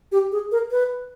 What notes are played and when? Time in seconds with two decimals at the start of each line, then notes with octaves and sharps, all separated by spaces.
0.12 G4
0.32 G#4
0.52 A#4
0.71 B4